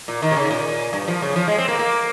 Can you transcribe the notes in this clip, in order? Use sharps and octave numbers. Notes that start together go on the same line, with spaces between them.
A#2
D#3
C3
C#3
A#2
G2
F3
C#3
F3
G#3
C4
A#3
A#3